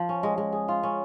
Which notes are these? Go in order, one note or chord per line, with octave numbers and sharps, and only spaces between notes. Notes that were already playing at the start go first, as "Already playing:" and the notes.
Already playing: F3
C#4
G#3
G#3
G#4
F4
C#4